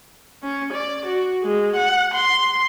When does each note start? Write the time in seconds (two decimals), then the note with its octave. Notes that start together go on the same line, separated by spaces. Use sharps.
0.43 C#4
0.74 D5
1.06 F#4
1.43 G#3
1.76 F#5
2.15 C6